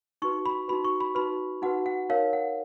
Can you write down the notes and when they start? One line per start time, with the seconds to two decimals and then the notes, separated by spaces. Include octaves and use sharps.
0.22 D#4 F#4 B4 C#6
0.46 B5
0.68 D#4 F#4 B4 B5
0.85 C#6
1.00 B5
1.15 D#4 F#4 B4 B5
1.62 D#4 F#4 B4 F#5
1.86 F#5
2.09 D#4 A#4 C#5 F5
2.33 F#5